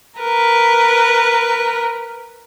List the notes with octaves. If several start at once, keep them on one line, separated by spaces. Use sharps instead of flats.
A#4 B4